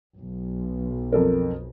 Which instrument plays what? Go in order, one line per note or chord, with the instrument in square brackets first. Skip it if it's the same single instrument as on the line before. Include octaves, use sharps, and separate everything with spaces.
[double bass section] B1
[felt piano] F2 A4 A#4